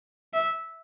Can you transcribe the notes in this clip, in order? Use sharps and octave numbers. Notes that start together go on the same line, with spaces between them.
E5